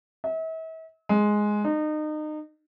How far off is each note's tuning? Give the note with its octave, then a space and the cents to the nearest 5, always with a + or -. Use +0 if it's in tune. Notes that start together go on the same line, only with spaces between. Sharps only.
E5 -40
G#3 +5
D#4 -30